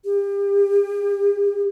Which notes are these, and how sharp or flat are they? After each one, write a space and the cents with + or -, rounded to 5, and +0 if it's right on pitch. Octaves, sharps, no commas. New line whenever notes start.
G4 +35